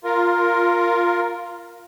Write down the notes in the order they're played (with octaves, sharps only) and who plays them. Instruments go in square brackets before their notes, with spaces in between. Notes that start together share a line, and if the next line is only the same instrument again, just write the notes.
[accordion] F4 A#4